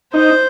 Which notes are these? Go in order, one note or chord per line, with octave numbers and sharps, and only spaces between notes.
D#4 C5